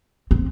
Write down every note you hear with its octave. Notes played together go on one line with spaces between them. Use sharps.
C4